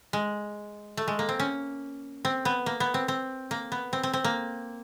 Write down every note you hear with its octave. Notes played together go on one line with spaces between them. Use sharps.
G#3
A3
G#3
A#3
C4
C#4
C4
B3
A#3
B3
C4
C4
A#3
B3
C4
C4
C4
A#3